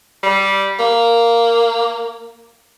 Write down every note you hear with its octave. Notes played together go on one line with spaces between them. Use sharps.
G3
A#3